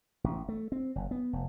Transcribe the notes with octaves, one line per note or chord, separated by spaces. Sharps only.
A1
A3
C4
F#1
B3
F1